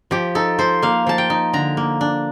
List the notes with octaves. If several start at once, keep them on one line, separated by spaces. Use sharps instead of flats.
F3 G4
D#4 A4
F3 C5
A#3 F5
F3 A5
G5
D#4
D3 A#5
A#3
D4